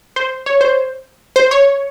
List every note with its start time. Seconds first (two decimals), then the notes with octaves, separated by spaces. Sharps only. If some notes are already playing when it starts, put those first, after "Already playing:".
0.16 C5
0.46 C#5
0.61 C5
1.36 C5
1.51 C#5